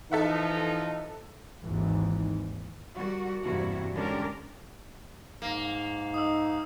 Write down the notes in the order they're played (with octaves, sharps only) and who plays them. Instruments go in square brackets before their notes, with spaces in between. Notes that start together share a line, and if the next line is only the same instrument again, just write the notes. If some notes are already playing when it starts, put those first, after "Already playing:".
[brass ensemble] E3 F3 D#4 [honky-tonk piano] A4 E5 F#5
[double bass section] G#1 D#2 G#2 E3
[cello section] G3 F#4 A#4
E2 G2 C3 A#3 E4 F#4
D3 G#3 C#4 D4 G4 A#4
[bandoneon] G#2 F5 [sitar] A#3
[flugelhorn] D#4 [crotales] D#6 E6